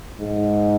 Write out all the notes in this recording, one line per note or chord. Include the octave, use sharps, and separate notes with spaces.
G#2